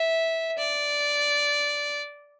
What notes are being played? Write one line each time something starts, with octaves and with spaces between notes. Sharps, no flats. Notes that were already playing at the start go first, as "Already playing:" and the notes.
Already playing: E5
D5